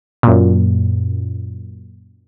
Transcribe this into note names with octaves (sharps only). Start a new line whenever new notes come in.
F#2 A#2